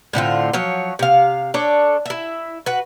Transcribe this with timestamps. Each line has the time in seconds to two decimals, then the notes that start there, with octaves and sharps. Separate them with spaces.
0.13 A2 D3 C4 F4
0.53 F3 F#3 C#5
0.99 C3 F5
1.54 D4 A4 C#5
2.06 E4 E5
2.66 F#4 B4